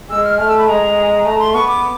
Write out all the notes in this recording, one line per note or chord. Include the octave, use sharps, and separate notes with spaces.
G#3 E6
F6
A3 F6
E6
B5
G#3 A#5
A3 A#5
C6
B3 C#6
D6